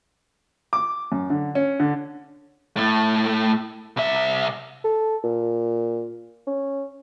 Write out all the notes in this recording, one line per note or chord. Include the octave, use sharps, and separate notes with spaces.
D6
F#2
D3
C#4
D3
A2 A3
C2 E5
A4
A#2
C#4